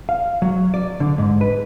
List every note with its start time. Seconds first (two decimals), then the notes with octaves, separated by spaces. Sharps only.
0.09 F5
0.42 F#3
0.74 D5
1.00 D3
1.18 G#2
1.41 B4